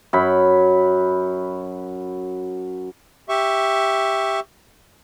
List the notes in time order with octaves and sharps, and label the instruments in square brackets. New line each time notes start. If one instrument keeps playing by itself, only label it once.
[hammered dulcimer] F#2 B5
[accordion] G4 E5 C#6